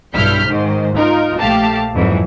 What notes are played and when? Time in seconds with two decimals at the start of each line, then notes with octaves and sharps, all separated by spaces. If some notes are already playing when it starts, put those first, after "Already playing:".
0.12 B1 G2 E4 F6 G6 B6
0.46 G#2 D#3 C5
0.95 D#4 F4 A#4
1.39 A#1 A3 G4 F5 A5
1.94 F2 G#2 E3 F#3